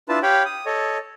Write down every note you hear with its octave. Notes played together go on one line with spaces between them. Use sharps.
D4 E4 F4 B4 A5
G4 C#5 F5 G5 B5
D#6
A4 C#5 D#5